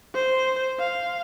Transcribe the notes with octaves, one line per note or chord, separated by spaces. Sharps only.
C5
F5